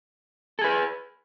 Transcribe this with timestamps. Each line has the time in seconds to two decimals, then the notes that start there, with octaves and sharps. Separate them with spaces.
0.59 A4
0.61 G#4
0.64 B4